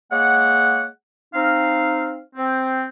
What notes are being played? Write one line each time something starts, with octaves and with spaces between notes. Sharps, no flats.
G#3 A#3 C#5 F#5
C4 D#4 F5
C4